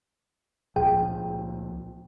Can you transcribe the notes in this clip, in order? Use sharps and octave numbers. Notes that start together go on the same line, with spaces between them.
C#2 A#2 F3 G#4 G5